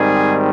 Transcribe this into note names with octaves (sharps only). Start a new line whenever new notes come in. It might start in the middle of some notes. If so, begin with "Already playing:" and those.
Already playing: G#2 D#3 G3 C4 G#4